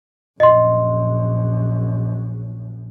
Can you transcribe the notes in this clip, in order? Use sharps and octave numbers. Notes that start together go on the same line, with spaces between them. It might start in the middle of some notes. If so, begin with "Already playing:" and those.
A#1 F#2 D#5 C6